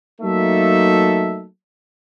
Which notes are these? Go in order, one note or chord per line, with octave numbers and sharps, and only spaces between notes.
F#3 A3 A#3 D#4 A4 E5